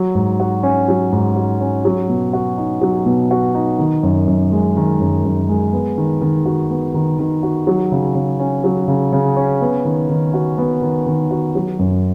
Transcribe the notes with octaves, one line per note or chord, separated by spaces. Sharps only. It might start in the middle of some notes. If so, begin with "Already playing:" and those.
Already playing: F#3
G#2
F#4
C#4
F#3
G#2
F#4
C#4
F#3
B2
F#4
D#4
F#3
B2
F#4
D#4
D#3
F#2
F#2
G#3
D#3
F#2
F#2
G#3
B3
D#3
D#3
F#4
B3
D#3
D#3
F#4
F#3
C#3
C#3
C#4
F#3
C#3
C#3
C#4
B3
D#3
D#3
F#4
B3
D#3
D#3
F#4
F#3
F#2